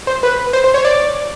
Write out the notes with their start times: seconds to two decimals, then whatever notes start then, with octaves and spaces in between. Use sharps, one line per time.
0.07 C5
0.23 B4
0.53 C5
0.64 C5
0.74 C#5
0.85 D5